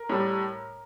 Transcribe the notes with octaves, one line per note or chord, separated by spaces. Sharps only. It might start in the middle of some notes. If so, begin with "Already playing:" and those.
Already playing: A#4
A2 G3